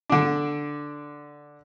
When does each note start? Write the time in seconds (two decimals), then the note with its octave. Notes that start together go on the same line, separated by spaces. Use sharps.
0.10 D3 D4